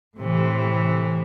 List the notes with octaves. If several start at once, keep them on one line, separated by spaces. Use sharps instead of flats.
A2 C3 E3